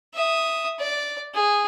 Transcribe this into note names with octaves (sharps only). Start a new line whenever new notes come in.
E5 D#6
D5
G#4